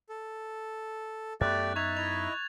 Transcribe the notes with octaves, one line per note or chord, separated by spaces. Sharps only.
A4
F#2 A3 B3 G4 D5 F#6 A6
D#4 E5 C#6 G#6 F7
E4 D#5 F7